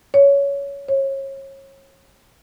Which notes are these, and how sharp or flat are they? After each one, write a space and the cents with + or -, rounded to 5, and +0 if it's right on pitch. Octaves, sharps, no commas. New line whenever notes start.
C#5 +15
C#5 -30